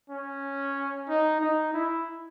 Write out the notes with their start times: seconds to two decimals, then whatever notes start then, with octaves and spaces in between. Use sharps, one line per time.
0.10 C#4
1.08 D#4
1.41 D#4
1.74 E4